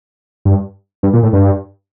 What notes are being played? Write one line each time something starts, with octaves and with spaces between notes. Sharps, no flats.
G2
G2
A#2
A2
G2